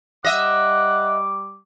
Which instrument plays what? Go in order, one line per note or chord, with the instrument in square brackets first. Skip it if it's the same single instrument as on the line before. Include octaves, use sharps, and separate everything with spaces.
[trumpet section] G3 D6 [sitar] D#5 E5 [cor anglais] F#5